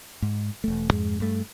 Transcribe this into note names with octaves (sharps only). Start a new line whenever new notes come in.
G#2
E1 A3
F2 G#2 G#3
G2 A3